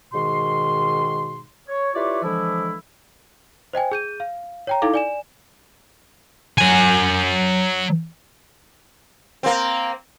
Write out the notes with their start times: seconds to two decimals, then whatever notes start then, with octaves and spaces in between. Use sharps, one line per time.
0.13 G#2 B2 D#3 C6
1.69 C#5
1.95 E4 F4 G4 B4 C#5 D5
2.23 D3 E3 F3 G#3 E4
3.73 C5 D#5 G5 G#5
3.92 G#4 G6 D#7
4.20 F5
4.67 C#5 G5 A#5
4.82 D#4 E4 A4 F5 D6
4.94 D5 G#5 E7
6.59 F#3 G#5
9.43 A#3 C4